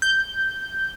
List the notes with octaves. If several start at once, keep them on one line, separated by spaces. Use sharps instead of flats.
G6